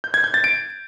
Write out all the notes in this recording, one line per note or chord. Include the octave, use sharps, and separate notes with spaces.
G6
G#6
G6
A6
D7